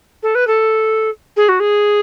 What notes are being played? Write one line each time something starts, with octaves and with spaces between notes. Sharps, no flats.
A4
B4
A4
G#4
F#4
G#4